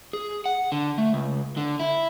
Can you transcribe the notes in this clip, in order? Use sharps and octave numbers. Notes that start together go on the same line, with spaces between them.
G#4
F#5
D3
A3
C#2
D3
E4